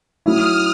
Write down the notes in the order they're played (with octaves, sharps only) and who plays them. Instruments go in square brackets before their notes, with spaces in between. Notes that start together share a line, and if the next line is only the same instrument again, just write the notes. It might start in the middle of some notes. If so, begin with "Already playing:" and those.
[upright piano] F#3 A3 C#4 E4 [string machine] D#6 F6